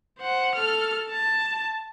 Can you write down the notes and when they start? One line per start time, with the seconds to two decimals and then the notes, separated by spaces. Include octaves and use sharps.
0.19 C5 F#5
0.55 A4 F6
1.10 A5